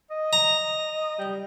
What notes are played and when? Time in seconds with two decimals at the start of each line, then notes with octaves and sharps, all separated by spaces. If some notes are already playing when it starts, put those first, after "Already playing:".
0.10 D#5
0.33 A#5
1.19 G3